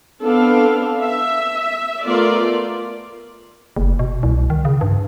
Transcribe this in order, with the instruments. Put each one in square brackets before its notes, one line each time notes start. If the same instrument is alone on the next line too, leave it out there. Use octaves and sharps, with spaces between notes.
[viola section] B3 C4 D4 A4 F5
E5
A3 B3 F4 A#4 D5
[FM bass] F#1
B2
C2
D#3
C#3
G2